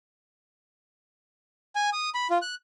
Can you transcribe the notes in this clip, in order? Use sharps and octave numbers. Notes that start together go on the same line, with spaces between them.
G#5
D#6
B5
F4
F#6